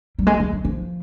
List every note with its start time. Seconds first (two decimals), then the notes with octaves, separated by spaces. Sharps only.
0.19 G3
0.27 G#3
0.40 F#3
0.53 F#3
0.65 F3